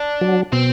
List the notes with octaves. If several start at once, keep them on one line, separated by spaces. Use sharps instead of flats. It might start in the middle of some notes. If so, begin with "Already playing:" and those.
Already playing: D4
F#3
B2 C4